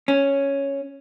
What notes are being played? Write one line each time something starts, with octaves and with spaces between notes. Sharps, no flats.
C#4